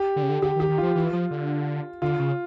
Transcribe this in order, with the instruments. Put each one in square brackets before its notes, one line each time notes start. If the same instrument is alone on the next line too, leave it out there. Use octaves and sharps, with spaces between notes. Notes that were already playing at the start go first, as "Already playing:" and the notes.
Already playing: [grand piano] G4
[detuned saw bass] D3
C#3
D3
[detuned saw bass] D3 [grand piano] G4
[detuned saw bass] D#3
[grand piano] G4
[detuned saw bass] D#3
[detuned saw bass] F3 [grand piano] F4
[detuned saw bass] E3
F3
D3
[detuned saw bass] D3 [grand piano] F4
[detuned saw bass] C#3